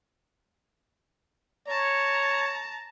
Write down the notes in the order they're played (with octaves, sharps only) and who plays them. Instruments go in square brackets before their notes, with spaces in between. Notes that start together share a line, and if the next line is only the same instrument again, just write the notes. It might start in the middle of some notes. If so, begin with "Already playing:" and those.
[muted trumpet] C#5 [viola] A5 A#5